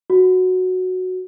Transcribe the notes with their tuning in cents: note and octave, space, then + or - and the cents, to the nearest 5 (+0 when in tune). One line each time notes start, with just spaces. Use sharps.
F#4 -5